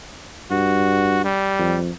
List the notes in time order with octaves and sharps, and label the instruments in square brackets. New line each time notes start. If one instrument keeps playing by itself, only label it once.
[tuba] G2 [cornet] F#4
[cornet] G3
[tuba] F2